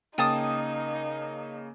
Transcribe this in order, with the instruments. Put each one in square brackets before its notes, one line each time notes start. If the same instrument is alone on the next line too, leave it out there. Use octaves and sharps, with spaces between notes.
[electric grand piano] C#3 A#3 D#7 [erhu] D#4 [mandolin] G5 A5 D#6